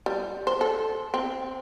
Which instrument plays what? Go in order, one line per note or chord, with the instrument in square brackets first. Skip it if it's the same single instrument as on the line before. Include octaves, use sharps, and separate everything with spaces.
[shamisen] G3
C5
A4
C4